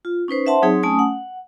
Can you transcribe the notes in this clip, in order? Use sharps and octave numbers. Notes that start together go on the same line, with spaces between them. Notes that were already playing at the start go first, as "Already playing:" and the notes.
F4
C#4 D#4 B4 C5
C5 E5 F#5 A5 C6
F#3 C4 D#4 G#4 C#5
A3 C#4 G#5 A5 D#6
F#5